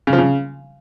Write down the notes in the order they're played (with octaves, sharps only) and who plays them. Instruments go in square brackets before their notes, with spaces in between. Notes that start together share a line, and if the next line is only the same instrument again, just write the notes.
[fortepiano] C#3
F3
C#3